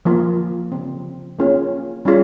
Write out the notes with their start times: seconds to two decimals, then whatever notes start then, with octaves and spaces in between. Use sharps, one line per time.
0.05 F3 A#3 F4
0.72 C#3 F3 C4
1.39 A#3 C#4 F4 G#4 C#5
2.05 G3 C#4 F4 G#4